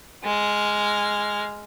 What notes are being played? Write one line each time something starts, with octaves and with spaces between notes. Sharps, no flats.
G#3 F6